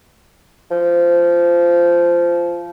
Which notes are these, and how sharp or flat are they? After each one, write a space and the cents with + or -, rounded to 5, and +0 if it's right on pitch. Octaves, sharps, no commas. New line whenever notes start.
F3 -15